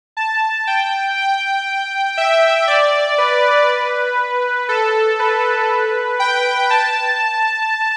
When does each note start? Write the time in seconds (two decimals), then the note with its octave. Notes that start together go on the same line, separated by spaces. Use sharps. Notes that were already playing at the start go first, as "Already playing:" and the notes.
0.17 A5
0.67 G5
1.17 G5
2.17 E5
2.67 D5
3.18 B4
4.69 A4
5.19 B4
6.20 G5
6.70 A5